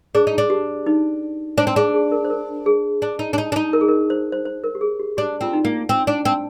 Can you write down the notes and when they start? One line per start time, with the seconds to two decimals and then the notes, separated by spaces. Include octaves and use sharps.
0.15 D4 G#4
0.27 D#4
0.38 D4
0.50 G4
0.86 D#4
1.58 D4 C5
1.67 C4
1.76 D4 G#4
1.94 G#4
2.12 A#4
2.25 C5
2.30 A#4
2.66 G#4
3.02 D4
3.19 D#4
3.33 D4
3.38 D#4
3.52 D4
3.56 D#4
3.73 A#4
3.81 G#4
3.88 A#4
4.10 C5
4.32 C5
4.45 C5
4.64 A#4
4.75 G4
4.81 G#4
5.00 G4
5.17 D4 G4
5.41 C4 F4
5.53 D#4
5.65 A#3
5.89 C4
6.07 D4
6.25 C4